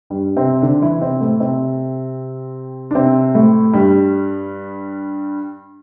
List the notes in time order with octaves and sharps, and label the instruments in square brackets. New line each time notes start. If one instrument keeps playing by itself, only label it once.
[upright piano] G2 G3
C3 C4
D3 D4
E3 E4
C3 C4
A2 A3
C3 C4
D4
C3 C4
A2 A3
G2 G3